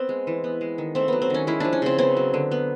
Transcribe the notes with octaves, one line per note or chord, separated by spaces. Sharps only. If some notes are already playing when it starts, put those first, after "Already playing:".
Already playing: B3 C4
G#3
E3
B3
G#3
D#3
A3 C4
F#3 B3
C4
D#3 C#4
G#3 E4
F3 D4
C#4
C#3 C4
B3 C4
F#3
D3
B3